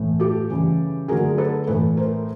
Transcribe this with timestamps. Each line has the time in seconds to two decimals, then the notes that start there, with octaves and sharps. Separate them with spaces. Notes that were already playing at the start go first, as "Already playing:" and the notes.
Already playing: A2 E3 A3
0.20 G4 A4
0.49 C#3 E3 G3
1.08 D3 F#3 A3 G#4 A#4
1.38 A4 B4
1.67 A2 E3 A3 A4 B4
1.97 A#4 C5